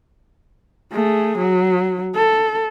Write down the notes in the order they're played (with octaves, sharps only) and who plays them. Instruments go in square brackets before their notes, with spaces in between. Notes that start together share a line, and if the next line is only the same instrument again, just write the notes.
[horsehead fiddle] A3 G#4
F#3
A4